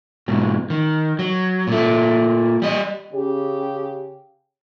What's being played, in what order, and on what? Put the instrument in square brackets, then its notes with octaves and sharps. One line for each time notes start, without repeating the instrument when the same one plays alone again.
[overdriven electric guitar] G#2 B2
D#3
F#3
A#2 A3
G3 D#5
[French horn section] C#3 G4